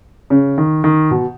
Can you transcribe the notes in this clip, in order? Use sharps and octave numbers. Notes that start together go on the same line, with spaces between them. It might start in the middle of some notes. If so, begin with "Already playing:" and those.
C#3
D#3
D#3
B2